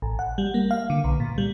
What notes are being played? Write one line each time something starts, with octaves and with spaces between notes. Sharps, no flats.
A1
F#5
G3
A#3
F5
D3
B1
A#2
G3